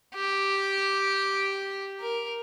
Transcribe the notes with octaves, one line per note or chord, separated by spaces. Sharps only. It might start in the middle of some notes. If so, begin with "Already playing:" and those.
G4
A#4